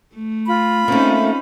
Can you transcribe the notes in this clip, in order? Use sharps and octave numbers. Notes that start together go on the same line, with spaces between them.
A3
F4 B5
A3 A#3 C4 C#4 D#4